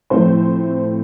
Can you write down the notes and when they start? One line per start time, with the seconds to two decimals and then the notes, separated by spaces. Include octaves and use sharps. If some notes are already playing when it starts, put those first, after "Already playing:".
0.10 A2 F3 A3 C4 C5